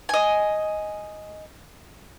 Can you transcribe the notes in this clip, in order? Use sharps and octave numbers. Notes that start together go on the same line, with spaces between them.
D#5 G#5